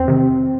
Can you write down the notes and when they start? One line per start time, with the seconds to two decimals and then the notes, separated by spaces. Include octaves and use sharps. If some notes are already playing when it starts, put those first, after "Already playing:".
Already playing: E2 C4
0.08 C3 D#3